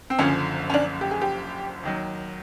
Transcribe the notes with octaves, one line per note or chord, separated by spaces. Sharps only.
C4
F#1 F#2 D3 F3 C#4
C#4
D4
G4
G#4
G4
D#2 D#3 F#3